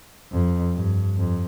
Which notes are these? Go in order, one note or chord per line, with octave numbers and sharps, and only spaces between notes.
F2
G2
F2